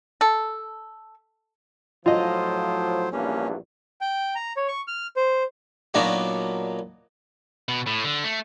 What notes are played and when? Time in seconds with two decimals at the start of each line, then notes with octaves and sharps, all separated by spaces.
0.21 A4
2.06 A2 F3 F#3 F4 C5 D#5
3.12 A#1 E2 G2 A#3 C#4
4.01 G5
4.35 A#5
4.57 C#5
4.68 C#6
4.88 F6
5.16 C5
5.94 A#2 F#3 B3 D4 D#4 F#4
7.69 B2
7.87 A2
8.04 D3
8.24 A3